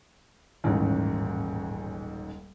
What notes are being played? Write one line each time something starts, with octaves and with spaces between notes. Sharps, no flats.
D#1 A1 G#2 C#3